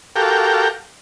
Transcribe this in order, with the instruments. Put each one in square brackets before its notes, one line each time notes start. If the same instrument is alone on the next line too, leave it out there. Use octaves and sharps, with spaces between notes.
[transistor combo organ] F#4 G4 A4 A#4 F5 G5